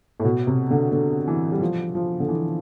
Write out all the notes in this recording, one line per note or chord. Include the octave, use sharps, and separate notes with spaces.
A2
B2
C3
D3
D3
E3
G3
F3
F3
D3
E3